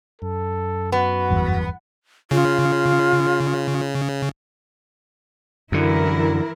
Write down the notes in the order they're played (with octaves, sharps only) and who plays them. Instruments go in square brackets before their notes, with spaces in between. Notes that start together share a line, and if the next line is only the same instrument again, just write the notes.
[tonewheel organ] F#2 [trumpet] A4
[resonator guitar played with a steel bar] B3 [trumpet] F#4
[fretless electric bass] G1 E2
[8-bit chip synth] C#3 [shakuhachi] F4
[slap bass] F#2 D3 [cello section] E3 E4 A#4